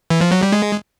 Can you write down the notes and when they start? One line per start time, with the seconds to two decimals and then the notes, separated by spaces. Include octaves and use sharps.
0.10 E3
0.21 F3
0.32 F#3
0.43 G3
0.52 G#3